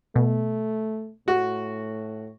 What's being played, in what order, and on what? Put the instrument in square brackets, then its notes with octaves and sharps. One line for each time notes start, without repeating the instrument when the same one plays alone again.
[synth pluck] B2 [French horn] A3
[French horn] A2 [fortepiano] F#4